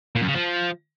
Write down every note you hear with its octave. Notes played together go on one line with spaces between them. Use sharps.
A#2
F#2
C#3
F3